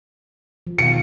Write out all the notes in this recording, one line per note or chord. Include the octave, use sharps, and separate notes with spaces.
F3
B2 D#3 F5 C#7